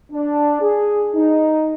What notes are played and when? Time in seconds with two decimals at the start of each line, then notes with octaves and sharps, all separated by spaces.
0.12 D4
0.61 G#4
1.15 D#4